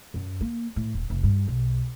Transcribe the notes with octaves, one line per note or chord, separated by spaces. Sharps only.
F#2
A#3
A2
D#1
F1
G2
B1